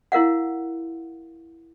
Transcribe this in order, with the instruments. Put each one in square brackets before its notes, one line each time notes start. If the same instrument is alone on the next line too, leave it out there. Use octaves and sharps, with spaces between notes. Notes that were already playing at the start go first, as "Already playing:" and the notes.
[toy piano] E4 A#4 F5 F#5